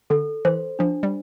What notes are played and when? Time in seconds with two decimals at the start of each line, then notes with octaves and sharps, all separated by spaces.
0.10 D3 A4
0.45 E3 C5
0.79 F3 D4
1.03 G3